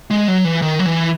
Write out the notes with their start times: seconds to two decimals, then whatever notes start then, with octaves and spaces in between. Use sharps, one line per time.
0.11 G#3
0.28 F#3
0.45 E3
0.62 D#3
0.79 F#3
0.86 E3